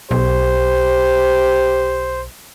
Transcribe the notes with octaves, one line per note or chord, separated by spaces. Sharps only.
B1 G4 C5